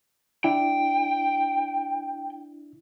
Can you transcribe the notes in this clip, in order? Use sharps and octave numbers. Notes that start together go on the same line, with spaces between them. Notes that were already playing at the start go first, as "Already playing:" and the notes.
D4 E4 G5